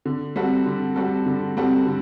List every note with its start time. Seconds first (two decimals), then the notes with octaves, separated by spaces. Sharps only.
0.05 D3
0.36 G3 C4 F#4 A4
0.66 D3
0.96 G3 C4 F#4 A4
1.26 D3
1.57 G3 C4 F#4 A4
1.87 D3